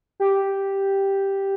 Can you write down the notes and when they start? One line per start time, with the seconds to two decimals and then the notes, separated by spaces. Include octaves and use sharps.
0.20 G4